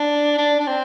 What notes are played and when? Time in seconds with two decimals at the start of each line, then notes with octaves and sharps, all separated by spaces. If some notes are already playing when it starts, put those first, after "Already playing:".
Already playing: D4
0.38 D4
0.60 D4
0.67 C4